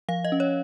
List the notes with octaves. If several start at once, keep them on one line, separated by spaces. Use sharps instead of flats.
F3 F5
D#5
C#4
C#5